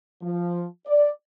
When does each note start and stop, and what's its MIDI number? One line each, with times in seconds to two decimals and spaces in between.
0.22 0.65 53
0.86 1.09 74